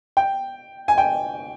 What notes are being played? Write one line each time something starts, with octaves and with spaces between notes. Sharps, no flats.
G5
G#5
G5